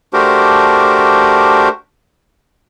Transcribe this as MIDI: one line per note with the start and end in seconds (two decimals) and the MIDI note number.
0.14 1.69 57
0.14 1.69 62
0.14 1.69 66
0.14 1.69 67
0.14 1.69 70
0.14 1.69 72